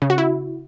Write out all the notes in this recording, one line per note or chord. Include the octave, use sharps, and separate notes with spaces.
C#3
F#4
E4